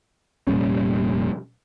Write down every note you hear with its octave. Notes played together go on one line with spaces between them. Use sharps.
F1 A#2 G3 C#4